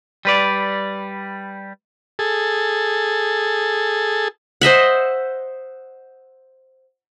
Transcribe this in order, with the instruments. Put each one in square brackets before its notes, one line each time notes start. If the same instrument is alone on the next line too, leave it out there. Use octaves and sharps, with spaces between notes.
[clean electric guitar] G3 B4 D5
[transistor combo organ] G#4 A4
[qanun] C5 D#5 E5 F#5